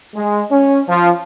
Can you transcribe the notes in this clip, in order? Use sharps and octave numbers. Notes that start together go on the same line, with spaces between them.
G#3
C#4
F3